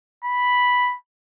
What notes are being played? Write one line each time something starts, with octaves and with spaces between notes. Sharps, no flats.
B5